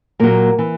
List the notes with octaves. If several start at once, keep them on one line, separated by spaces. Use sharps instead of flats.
A#2 F#3 A#3
E3